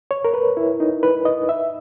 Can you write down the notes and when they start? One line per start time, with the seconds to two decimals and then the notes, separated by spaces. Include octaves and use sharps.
0.11 C#5
0.25 A#4
0.34 B4
0.57 E4
0.80 D#4
1.03 B4
1.25 D#5
1.49 E5